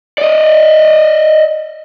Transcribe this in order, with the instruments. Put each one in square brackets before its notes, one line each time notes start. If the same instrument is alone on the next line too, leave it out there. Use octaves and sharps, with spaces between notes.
[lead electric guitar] D5 D#5